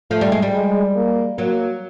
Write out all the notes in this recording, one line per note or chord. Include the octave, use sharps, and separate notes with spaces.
F3 A3
G3
G#3
G3
G#3
A#3
F#3 A#3